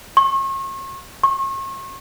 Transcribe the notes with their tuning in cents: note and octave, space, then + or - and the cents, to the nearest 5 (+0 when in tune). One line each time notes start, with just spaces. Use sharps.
C#6 -40
C#6 -40